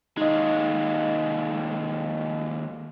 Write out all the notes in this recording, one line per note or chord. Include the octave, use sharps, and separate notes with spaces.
D#2 G#3 D#4 D#5